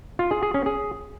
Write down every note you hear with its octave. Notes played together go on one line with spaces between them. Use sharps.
F4
G#4
G#4
C#4
G#4